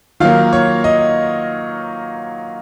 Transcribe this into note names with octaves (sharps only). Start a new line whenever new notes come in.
D#3 F#3 A#3 F4 F5
C#5
D#5